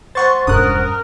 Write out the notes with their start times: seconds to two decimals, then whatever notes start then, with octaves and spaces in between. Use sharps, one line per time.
0.15 C5 F#5 C6 C#6 A6
0.47 E1 G2 C#4 A#4 D#6 F#6